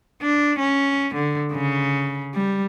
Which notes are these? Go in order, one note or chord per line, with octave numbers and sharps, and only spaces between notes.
D4
C#4
D3
C#3
G3